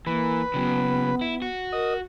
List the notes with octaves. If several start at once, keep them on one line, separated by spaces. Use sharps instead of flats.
E3 A#3 B4
C#3 F#3 B3
E4
F#4
A#4 D#5